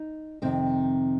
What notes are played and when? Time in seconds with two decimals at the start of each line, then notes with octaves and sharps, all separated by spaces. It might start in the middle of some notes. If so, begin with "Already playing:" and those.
Already playing: D#4
0.42 F2 C3 D#3 C4